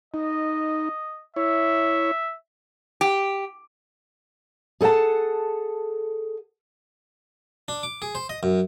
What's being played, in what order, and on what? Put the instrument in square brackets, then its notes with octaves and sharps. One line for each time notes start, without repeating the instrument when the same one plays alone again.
[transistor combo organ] D#4 [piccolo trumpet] D#5
[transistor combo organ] E4 C#5 [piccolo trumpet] E5
[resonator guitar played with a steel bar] G4
[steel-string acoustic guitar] G#4 A4 C#5 F#5 A5
[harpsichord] D4
D6
G#4
C5
D#5
F#2